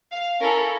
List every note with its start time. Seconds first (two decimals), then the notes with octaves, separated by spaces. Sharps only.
0.12 F5
0.40 C#4 E4 A4 A#4